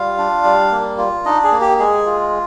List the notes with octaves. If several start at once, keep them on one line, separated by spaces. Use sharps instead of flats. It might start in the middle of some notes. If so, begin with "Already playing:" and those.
Already playing: G3 F4 F5
D4
G3
A#3
F4
D4 D#4 D#5
G#4
A#3
G4
G#3 G#4
F4